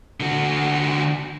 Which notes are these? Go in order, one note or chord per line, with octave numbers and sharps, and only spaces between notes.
D3 F#4